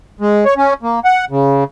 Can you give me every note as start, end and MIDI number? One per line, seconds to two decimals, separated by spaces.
0.21 0.45 56
0.45 0.54 73
0.57 0.73 61
0.83 1.00 58
1.05 1.25 78
1.31 1.64 49